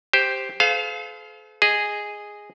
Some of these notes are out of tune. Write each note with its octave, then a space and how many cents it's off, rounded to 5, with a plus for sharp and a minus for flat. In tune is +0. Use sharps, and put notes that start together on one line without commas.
G4 +0 C5 +0
A4 -45 C5 -45 F5 +0
G#4 -5 D#5 +0